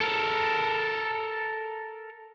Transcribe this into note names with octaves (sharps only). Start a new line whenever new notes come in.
A4 A#4